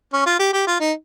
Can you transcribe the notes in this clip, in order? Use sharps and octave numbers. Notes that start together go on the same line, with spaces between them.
C#4
F4
G4
G4
F4
D#4